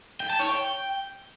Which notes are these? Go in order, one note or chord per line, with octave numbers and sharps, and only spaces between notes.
G5
A5
C#5
G5